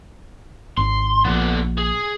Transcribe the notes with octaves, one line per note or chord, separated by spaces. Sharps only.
G#1 C6
A#1 D3 B3
G#4